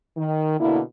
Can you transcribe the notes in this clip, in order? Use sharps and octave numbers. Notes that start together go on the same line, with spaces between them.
D#3
B2 D3 A#3 E4